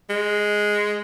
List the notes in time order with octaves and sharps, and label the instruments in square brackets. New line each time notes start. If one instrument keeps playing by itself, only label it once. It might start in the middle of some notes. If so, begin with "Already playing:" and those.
[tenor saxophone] G#3